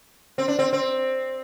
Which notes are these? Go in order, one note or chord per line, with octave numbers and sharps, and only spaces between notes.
C4
D4
C4
C4